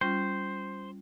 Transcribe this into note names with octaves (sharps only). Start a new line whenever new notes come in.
G3 C#4 F4 C5